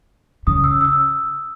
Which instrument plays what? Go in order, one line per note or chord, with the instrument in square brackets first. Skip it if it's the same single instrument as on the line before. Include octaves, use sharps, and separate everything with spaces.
[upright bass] C#3 [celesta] D#6
[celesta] E6
E6